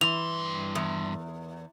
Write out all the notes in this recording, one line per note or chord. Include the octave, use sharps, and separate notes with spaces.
G2 E3 C6 F7
E2